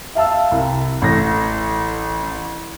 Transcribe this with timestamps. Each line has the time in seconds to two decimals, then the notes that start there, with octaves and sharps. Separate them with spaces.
0.15 E5 F5 A5 E6
0.52 C2
1.02 A1 A#6